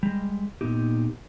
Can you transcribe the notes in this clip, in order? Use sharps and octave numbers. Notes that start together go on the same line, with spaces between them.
G3 G#3
A#2 C#3 B3 D#4 G4